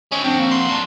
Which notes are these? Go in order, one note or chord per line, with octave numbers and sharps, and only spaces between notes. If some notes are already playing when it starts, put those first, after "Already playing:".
G#3 C4 C#4
F2 C4 D4 F#4 G5
A#3
C6
F#3 D4